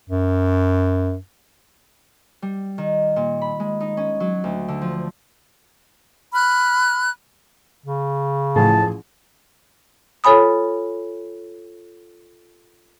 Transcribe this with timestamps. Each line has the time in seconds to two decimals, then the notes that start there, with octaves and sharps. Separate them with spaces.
0.09 F#2
2.42 G3
2.78 D#3
3.16 A#2
3.42 B5
3.60 G#3
3.81 D#4
3.97 C#4
4.20 F#3
4.44 D2
4.68 D3
4.81 F3
6.34 B5 F6 F#6
7.86 C#3
8.56 A1 A2 F3 G#4 A5
10.24 F4 A4 C#5 G#5 B5 D#6